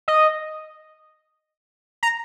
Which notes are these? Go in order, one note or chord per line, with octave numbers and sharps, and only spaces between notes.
D#5
A#5